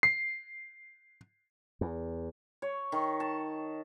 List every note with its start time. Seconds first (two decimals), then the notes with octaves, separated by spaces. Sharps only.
0.03 C7
1.81 E2
2.62 C#5
2.92 D#3
3.20 A5